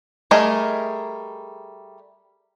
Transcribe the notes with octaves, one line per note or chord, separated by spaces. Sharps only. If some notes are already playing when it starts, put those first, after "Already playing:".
G3 A3 G#4 A#4 D#5